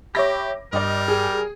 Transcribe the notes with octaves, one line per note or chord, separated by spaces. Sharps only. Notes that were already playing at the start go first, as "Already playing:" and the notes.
G4 C#5 E5 B5 D6 A#6
G2 G3 G4 A#4 D5 D#5
G#4